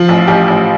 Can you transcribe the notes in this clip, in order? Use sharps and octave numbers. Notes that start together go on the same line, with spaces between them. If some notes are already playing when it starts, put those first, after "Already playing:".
Already playing: F3 F4
A1
A1 G4
A1